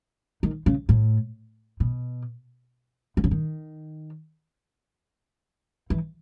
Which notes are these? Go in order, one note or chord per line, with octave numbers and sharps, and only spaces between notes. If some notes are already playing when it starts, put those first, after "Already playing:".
D#3
C#3
A2
B2
D#3
C#3
D#3
E3